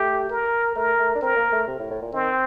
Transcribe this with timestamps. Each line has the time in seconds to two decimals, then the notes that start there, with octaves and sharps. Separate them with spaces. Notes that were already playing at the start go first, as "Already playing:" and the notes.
Already playing: A3 G4
0.30 A#4
0.76 A3 A#4
0.99 A3
1.15 D4
1.21 C4 A#4
1.37 A#3
1.53 A3
1.67 C3
1.80 A2
1.91 A2
2.02 A#2
2.13 D#3 C4